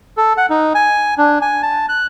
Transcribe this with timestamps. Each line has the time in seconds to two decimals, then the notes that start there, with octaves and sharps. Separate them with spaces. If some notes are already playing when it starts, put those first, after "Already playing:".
0.17 A4
0.37 F#5
0.50 D#4
0.75 G#5
1.18 D4
1.41 G#5
1.62 A5
1.89 F#6